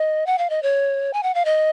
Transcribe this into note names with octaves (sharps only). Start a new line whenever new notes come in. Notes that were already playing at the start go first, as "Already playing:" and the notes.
Already playing: D#5
F#5
F5
D#5
C#5
G#5
F#5
F5
D#5